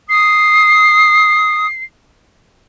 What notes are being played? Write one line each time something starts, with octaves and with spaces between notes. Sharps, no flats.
D#6 C7